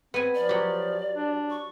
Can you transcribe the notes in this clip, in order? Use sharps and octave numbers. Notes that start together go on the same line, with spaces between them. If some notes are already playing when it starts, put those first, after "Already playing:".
B3 C4 G#5
F3 D5
F#3 G4
D4
C#6